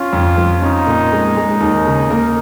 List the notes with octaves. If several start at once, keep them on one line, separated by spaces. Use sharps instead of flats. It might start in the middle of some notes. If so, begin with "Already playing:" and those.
Already playing: C#4 F4
F2
F3
C#4 D#4
A#2
G#3
G#3
D#2
C#3
A#3